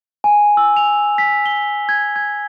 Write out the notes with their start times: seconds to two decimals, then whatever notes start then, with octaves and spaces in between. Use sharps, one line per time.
0.24 G#5
0.57 E6
0.77 F7
1.18 B6
1.46 G7
1.89 G#6
2.16 G#6